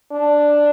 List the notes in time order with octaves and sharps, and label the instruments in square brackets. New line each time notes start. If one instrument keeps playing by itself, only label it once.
[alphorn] D4